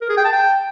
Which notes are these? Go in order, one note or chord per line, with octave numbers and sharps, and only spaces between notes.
A#4
G#4
G5
A5
G5